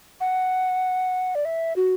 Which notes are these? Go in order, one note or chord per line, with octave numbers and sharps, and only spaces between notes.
F#5
D5
E5
F#4